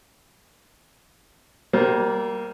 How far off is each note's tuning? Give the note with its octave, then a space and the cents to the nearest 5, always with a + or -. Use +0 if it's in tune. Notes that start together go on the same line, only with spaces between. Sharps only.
G3 -30 A#3 +0 C5 +0